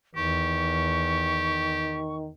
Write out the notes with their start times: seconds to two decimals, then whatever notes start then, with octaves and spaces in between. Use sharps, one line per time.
0.16 E2 D#3 G4 C#6